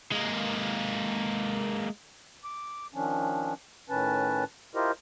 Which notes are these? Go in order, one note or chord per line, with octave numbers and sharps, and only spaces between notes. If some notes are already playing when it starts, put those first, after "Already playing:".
G#3 A#3
D6
D#3 F3 C#4 D4
A2 D#3 C#4 B4 A5
E4 F4 G4 A#4 C5 D#5